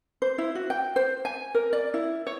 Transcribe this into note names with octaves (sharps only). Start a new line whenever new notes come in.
C5
E4
F#4
G5
C5
G#5
A#4
D5
E4
C#5